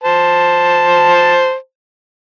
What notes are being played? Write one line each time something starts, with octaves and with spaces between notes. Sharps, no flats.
C5 A5